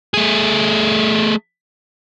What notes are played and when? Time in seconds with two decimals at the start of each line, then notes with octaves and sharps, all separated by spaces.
0.14 A3 G#4